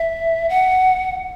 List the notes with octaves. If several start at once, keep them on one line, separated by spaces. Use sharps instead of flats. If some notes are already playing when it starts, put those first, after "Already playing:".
Already playing: E5
F#5